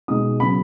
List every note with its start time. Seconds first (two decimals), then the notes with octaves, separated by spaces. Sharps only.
0.08 B2 G#3 D#4 D#6
0.40 C#3 F#3 B3 B5